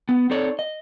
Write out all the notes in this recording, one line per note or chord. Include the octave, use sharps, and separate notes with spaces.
B3
C4 D#4 A4 C#5 D5
D#5